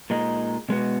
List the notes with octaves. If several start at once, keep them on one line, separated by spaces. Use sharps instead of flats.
A#2 G#3 D#4
B2 G#3 B3 F#4